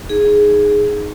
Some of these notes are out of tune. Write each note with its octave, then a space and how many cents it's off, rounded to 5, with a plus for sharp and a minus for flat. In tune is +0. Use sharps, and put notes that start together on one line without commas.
D#4 +0 G#4 +0